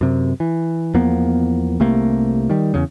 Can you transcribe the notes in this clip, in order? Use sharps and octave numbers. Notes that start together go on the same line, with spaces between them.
F#2 C3
E3
E2 F3 A#3 B3
C2 C3 A3 A#3
D#3 G3
E2 C#3